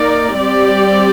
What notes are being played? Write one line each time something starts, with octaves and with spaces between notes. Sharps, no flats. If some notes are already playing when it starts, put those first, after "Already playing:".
Already playing: A#3 D#4 A#4 D5
G3 C4 G4 D5